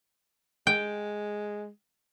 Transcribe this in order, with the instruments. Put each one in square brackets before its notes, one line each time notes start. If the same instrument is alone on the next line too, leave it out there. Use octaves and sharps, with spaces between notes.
[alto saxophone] G#3 [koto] G5